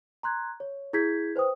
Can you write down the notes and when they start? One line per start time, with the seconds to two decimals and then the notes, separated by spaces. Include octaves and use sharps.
0.23 A#5 C6 F#6 G#6
0.60 C#5
0.93 E4 G#4 G6 G#6 B6
1.36 B4 C5 G5 D#6